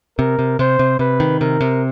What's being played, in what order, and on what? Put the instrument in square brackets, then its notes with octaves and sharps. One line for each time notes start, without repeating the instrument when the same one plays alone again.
[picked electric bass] C3 [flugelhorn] A#4
[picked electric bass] C3
[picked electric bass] C3 [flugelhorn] C5
[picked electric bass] C3
[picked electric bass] C3 [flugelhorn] B4
[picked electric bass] D#3
[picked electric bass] C3 [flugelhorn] A#4
[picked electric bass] C3